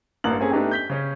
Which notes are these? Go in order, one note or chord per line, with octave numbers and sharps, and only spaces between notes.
A1 G2 A#3 F#7
A#3 C4 C#4 G#4 A4
A3 B3 D4 D#4 G4
G6 B6 G7
C#3 C#4